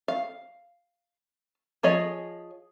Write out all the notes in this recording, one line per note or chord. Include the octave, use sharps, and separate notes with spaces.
F5
F3 G#4 C#5 D#5